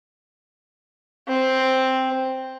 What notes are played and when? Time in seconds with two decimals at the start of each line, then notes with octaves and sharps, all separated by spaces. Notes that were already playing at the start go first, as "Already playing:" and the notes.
1.27 C4